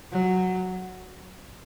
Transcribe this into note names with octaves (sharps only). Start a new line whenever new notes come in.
F#3